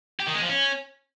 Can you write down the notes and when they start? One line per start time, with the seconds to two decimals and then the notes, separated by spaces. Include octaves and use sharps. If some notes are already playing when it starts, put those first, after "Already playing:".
0.20 G4
0.27 D#3
0.34 G#3
0.42 F3
0.49 C#4